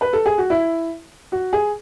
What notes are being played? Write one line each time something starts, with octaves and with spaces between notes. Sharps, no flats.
B4
A4
G#4
F#4
E4
F#4
G#4